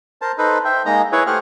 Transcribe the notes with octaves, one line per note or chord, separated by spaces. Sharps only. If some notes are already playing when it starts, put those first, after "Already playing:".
A#4 C5 A5
D#4 A4 B4 C5
C5 E5 G5
G#3 A#3 D#4 D#5 A#5
E4 G#4 B4 C#5
A3 G4 G#4 C5 F#5 F6